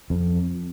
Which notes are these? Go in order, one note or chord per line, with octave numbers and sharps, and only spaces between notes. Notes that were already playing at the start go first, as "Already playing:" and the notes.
F2